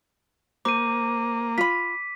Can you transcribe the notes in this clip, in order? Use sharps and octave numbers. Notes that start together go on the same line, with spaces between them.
A#3 C5 D6 D#7
F4 B5 B6